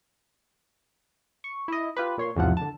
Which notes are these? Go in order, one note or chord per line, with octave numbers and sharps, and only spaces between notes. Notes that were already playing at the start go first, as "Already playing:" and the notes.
C#6
E4 D#5
F4 G4 B4
A#2 C#5 C6
B1 E2 G#2 C3 F3 F#5
D3 A5